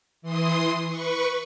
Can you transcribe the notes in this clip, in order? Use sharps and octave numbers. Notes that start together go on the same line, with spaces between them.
E3 C6 D#6
B4 C#6